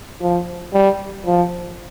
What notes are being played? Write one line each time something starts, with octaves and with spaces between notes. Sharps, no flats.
F3
G3
F3